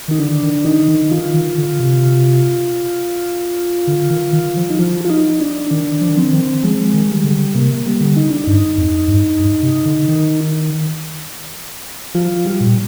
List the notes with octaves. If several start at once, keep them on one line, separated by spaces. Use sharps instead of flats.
D#3 D#4
D3 D4
D#3
D#3 D#4
D#3
D#3 F4
D#3
D3
C3
D3
D#3
D#3
F3
D#4
F3 F4
F4
D#4
D4
D#3 D4
F3
D#3
F3 C4
D#3
F3 G#3
D#3
G3
D3
C3 A#3
G3
D3
D#4
D4
G2 D#4
F2
G2
G2
C3
D3
D#3
F3 F4
G3
A#2